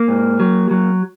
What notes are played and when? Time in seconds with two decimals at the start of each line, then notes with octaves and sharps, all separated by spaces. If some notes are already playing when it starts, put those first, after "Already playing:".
Already playing: A#3
0.08 G#2
0.40 F#3
0.71 F#3